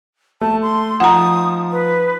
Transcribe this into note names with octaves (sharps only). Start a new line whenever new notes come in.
A3 A5
C6
F3 D#4 F#5 A#5 D#6
B4